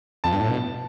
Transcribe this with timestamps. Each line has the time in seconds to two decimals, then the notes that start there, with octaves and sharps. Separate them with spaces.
0.24 F2 A5
0.33 G2
0.41 A2
0.49 B2